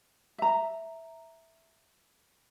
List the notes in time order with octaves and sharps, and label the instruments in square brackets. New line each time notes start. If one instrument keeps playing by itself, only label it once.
[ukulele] E5 A#5